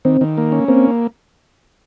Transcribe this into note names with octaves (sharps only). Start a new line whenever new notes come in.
D#3 C4
D#3
A#3
C#4
A#3 C4